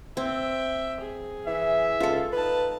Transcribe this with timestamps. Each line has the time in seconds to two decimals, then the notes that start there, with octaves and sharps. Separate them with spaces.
0.17 C4 E5 G5
1.01 G#4
1.47 E3 E5
2.00 C#2 F4 A4
2.33 D#4 B4 A5